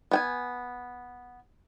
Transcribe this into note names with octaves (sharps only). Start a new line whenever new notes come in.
B3 G5 G#5